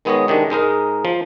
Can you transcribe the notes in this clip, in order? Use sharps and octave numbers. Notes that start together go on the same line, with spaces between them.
D#3 G#3 B3 G#4 C#5 D#5
C3 D#3 G#3 D4
G#2 G#3 D#4 A#4
F3